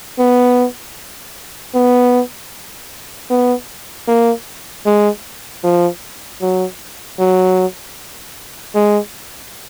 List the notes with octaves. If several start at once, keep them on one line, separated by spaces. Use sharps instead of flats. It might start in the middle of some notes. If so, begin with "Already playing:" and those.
B3
B3
B3
A#3
G#3
F3
F#3
F#3
G#3